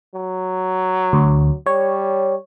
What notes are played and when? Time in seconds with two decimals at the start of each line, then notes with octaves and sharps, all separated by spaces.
0.15 F#3
1.13 D2
1.66 G3 C#5